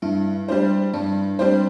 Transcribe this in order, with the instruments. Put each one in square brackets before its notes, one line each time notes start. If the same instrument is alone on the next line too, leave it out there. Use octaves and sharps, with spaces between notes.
[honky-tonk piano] G2 [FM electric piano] E4
[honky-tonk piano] G3 D4 C5
[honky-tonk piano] G2 [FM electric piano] D4
[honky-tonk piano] G3 D4 C5 [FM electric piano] C4